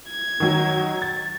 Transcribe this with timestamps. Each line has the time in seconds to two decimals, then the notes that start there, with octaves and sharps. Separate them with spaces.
0.10 G#6
0.40 D#3 F#3
1.02 A6